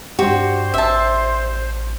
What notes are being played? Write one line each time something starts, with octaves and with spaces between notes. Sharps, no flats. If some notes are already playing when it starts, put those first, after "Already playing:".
G2 D4 F#4 G4 C5
A1 E5 A5